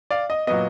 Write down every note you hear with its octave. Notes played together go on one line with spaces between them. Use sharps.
D5 F5
D#5
A#2 F#3 B3 D#5